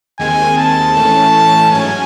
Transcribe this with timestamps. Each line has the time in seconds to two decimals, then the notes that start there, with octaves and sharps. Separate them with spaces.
0.19 D#2 D#3 G#3 C4 G#5
0.58 A5
0.96 A2 E3 A3 C#4
1.71 G#2 F#3 C#4 G#5